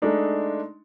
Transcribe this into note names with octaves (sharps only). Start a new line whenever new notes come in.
G#3 A3 D4 D#4